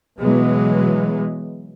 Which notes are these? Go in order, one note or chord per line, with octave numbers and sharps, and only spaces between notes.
B2 E3 F#3 G#3 B3